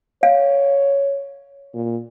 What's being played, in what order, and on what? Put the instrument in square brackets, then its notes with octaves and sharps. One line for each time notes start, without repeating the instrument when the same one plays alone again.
[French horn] C#5 [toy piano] F5
[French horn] A#2